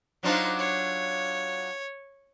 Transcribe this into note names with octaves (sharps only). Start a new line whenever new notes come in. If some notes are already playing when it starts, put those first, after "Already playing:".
F#3 D4 D#4 F4 C5
C#5